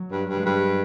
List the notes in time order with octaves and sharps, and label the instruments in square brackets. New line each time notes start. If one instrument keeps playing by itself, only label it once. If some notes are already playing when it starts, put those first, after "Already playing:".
Already playing: [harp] F#3
[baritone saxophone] G2
G2
[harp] G#3
[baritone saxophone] G2 [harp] G3